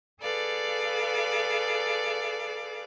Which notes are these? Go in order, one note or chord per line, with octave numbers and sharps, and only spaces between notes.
G#4 A4 B4 D5 F5